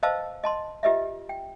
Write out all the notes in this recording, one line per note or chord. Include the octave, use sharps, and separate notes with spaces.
B4 C5 D#5 F5 A5 E6
D#5 A5 C6
F4 G4 B4 D#5 E5
G5